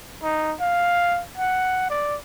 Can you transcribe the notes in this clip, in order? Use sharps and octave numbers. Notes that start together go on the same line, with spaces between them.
D#4
F5
F#5
D5